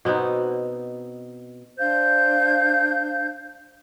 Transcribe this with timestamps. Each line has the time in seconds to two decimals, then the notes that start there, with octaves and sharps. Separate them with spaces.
0.05 B2 B3 C4 D#4
1.78 D4 C5 F5 G6